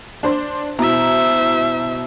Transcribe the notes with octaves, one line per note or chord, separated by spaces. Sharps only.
D4 C5 C6
B2 E4 C5 E5 A#5